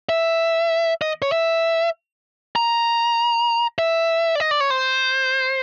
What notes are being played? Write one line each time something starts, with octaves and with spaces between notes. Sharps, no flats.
E5
D#5
C#5
E5
A#5
E5
D5
D#5
D5
C#5
C5